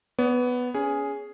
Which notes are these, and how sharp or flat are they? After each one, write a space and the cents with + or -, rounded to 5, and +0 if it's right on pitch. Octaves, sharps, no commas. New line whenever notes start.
B3 +5 C#5 +45
C#4 +25 G#4 +0